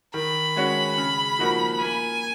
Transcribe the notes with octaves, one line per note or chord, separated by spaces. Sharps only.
D#3 B5
G#3 C#4 F#4 C#5
C#3
F3 A#3 D#4 F#4
A#3 G#5